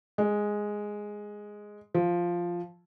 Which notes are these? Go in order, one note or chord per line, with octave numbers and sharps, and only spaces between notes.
G#3
F3